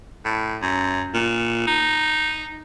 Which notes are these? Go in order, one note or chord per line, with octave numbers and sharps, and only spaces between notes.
A2
F#2
A#2
D#4